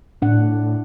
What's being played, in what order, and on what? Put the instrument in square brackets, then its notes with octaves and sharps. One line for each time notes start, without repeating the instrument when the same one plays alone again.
[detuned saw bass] A2 [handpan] D4 F#5